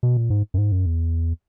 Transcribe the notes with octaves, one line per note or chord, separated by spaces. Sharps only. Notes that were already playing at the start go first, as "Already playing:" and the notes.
B2
A#2
G#2
F#2
G#2
F#2
E2